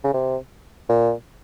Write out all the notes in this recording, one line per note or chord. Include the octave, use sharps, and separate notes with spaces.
C#3
C3
A#2